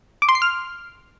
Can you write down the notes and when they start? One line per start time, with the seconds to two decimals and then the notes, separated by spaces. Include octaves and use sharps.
0.22 D6
0.29 C6
0.35 C7
0.42 F6